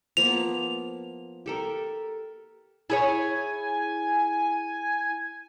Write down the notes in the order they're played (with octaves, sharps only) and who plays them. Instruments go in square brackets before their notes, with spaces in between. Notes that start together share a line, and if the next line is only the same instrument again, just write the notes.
[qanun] F3 A#3 B3 [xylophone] F7
[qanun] G4 A4 A#4
[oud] E4 G#4 C#5 [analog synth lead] G#5